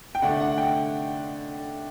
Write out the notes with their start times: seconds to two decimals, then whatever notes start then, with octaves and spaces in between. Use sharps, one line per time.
0.15 G5
0.22 D3 A3 D4 F#5
0.40 F#5
0.58 G5